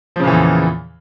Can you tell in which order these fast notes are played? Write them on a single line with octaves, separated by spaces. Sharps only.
F3 C#3 A#2 E3 E2